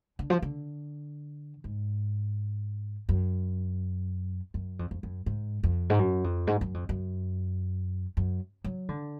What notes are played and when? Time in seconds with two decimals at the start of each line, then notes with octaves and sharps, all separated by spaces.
0.19 D3
0.30 F3
0.42 D3
1.64 G#2
3.09 F#2
4.54 F#2
4.79 F2
4.91 F2
5.03 F#2
5.26 G#2
5.63 F2
5.90 G#2
5.99 F#2
6.24 F2
6.47 G#2
6.61 F#2
6.74 F2
6.89 F#2
8.17 F#2
8.64 F#3
8.89 D3